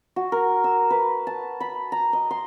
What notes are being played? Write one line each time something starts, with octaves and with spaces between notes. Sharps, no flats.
F#4
A#4
E6
B4
A5
B5
A#5
D#5
C6